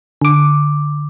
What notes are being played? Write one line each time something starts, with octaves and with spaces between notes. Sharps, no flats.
D3 D6